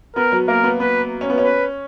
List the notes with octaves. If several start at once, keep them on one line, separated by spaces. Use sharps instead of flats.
B3 A#4
F#3
A#3 A#4
B3
B3 B4
C#4
B3
C#4
B4